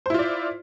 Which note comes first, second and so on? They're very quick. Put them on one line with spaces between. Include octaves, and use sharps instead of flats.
C5 E4 F4 D5